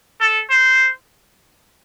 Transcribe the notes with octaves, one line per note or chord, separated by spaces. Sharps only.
A4
C5